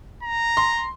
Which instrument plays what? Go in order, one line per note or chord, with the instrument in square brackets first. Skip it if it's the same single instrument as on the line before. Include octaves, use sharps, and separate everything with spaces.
[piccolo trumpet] A#5
[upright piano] C6